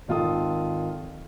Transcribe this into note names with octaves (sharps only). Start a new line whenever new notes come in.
G#1 D#3 F4 A4 D#6